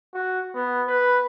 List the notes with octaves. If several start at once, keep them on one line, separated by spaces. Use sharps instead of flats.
F#4
B3
B4